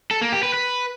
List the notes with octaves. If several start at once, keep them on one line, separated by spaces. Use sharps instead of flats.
A4
A#3
G4
B4
B4